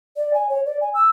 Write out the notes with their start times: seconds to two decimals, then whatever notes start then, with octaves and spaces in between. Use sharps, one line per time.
0.17 D5
0.34 G#5
0.49 C#5
0.66 D5
0.81 G#5
0.94 E6